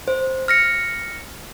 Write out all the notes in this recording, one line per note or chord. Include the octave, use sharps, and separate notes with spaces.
C5
F6 A#6 C#7